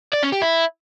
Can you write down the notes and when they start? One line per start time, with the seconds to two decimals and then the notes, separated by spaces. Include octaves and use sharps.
0.13 D5
0.23 C#4
0.32 G4
0.42 E4